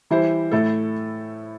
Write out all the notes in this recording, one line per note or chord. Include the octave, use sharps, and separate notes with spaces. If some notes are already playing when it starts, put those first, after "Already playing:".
E3 G3 E4 C5
A2 A3 E4 A4